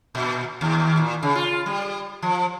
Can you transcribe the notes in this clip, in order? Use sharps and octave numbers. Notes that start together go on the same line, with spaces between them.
A#2
D#2
A#2
C#3
F4
G3
F3